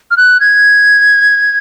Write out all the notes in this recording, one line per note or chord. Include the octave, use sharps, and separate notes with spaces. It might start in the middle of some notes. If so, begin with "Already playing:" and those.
F6
F#6
G#6